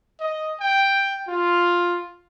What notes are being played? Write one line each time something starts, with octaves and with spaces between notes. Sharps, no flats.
D#5
G5
F4